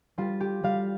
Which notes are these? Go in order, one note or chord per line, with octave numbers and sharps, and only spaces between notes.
G3 F4
G4
G3 F5